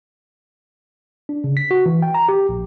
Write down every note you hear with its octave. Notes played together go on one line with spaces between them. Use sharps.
D4
C#3
B6
F#4
E3
G5
A#5
G4
A#1